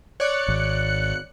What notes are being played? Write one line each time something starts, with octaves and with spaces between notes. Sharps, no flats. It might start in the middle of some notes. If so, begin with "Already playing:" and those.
C#5 D5 F#6 C#7
G#1